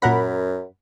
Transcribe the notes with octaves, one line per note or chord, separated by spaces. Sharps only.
F#2 A#2 A#4 F#5 B5 A#6